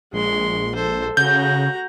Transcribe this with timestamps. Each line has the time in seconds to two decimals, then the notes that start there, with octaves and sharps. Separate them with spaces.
0.13 A#1 G#3 C6
0.75 A4 C5
1.17 C#3 F#4 A#5 G6